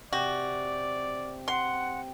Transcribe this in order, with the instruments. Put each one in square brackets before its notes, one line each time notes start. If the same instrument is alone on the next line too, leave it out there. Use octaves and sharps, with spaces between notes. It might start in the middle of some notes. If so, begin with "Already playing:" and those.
[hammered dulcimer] C3 G4 [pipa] F#4 [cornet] D5
[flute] F#5 [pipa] C6